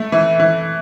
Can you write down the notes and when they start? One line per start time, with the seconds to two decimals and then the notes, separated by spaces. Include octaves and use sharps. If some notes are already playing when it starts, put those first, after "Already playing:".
Already playing: A3
0.12 E3
0.40 E3